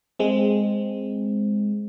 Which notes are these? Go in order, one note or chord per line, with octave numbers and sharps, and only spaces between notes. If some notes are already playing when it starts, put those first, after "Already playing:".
G#3 C4